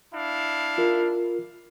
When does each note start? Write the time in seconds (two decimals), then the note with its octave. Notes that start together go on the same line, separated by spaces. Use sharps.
0.13 D4 E4 F5
0.78 F4 A#4